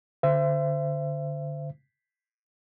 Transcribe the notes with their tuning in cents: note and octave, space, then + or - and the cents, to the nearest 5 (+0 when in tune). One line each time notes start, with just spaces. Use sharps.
D3 +0 C5 -20 E5 +30